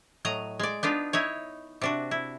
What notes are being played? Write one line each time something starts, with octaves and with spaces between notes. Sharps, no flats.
A2 F#3 D#5 A#5
G#3 D5
B3 D4 D#4 F4
D#4 E4 C#5
C3 D4 F#4
E4